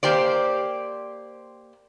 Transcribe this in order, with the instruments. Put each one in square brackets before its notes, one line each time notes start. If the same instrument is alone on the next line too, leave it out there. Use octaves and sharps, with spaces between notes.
[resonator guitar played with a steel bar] A#3 G4 C5 D5